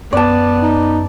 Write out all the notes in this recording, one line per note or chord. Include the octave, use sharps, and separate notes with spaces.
F#2 B3 D5 A5
D#4